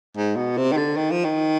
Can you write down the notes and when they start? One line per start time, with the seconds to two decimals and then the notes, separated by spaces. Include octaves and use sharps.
0.17 G#2
0.37 B2
0.57 C3
0.72 D#3
0.77 D3
0.97 D#3
1.11 F3
1.24 D#3